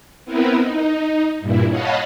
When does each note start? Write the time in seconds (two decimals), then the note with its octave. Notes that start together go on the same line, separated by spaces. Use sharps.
0.25 B3 C4 E4 A#4 B4
0.58 D#4
1.40 G2 A#2 E4
1.69 C#5 D#5 F5 F#5 A5 B5